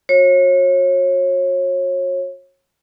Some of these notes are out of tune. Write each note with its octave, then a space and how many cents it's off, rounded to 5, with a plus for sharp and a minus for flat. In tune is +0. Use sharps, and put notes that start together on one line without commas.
F#4 -35 C#5 -35